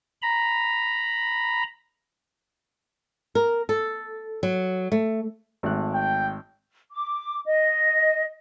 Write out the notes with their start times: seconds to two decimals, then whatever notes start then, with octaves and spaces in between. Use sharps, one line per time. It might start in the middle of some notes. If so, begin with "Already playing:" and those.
0.22 A#5 B5
3.35 A#4
3.69 A4
4.43 F#3
4.92 A3
5.63 G#1 A3 F#6
5.94 G5
6.91 D6
7.45 D#5